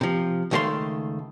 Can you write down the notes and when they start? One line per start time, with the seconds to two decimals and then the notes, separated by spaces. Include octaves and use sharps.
0.01 C3 F3
0.51 C#2 D#3 A3 C#5 F5 C6